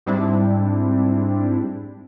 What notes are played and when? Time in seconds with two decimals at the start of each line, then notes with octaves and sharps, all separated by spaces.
0.06 G#2 G3 C4 D4 E4